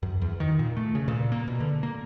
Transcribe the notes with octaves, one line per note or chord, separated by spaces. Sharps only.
F#2
E2
D#3
A#2
A3
C#3
A#2
A#3
B2
D3
A#3